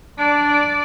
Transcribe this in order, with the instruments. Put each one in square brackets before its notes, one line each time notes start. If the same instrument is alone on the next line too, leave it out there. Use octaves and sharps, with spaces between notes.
[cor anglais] D4 [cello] D5